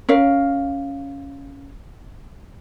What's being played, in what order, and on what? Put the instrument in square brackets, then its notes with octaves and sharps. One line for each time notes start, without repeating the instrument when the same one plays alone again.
[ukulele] C#4 A#4 F5